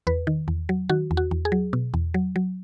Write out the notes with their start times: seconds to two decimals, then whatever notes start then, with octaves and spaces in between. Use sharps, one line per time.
0.07 E2 B4
0.27 D#3
0.48 E2
0.69 F#3
0.89 D#3 F#4
1.11 E2
1.17 F#4
1.31 E2
1.45 G#4
1.52 F#3
1.73 B2
1.94 E2
2.14 F#3
2.36 F#3